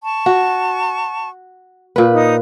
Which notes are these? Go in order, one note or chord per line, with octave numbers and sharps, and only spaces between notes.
A5 C#6
F#4
A#2 B4
D#4 D#5 D#6